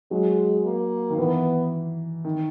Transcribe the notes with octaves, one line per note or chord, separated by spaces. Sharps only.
F#3 G#3
A#3
D#3
E3 B3
D#3